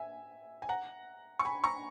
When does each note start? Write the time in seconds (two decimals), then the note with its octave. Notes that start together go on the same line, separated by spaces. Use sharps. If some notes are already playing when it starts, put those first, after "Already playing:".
Already playing: E5 G#5
0.62 G#5
0.69 F#5 A#5
1.39 C#6
1.45 G#5 B5
1.64 A#5 C#6